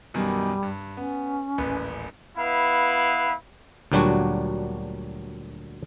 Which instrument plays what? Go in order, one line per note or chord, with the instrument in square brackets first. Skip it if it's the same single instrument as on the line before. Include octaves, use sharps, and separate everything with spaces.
[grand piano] F#2 B2 D#3 [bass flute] G3
[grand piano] G2
[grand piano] B3 [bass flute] C#4
[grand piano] D#1 A1 B4
[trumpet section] B3 E4 B4 F5 B5
[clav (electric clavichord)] D2 A#2 F#3 G3 D4 F#4